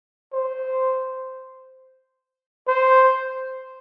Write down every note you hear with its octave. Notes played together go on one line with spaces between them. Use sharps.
C5
C5